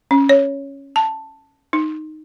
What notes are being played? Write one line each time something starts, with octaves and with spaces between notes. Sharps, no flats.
C#4
C#5
A5
D#4